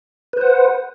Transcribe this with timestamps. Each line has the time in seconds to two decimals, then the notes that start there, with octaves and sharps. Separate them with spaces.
0.33 B4
0.37 C5
0.41 F#5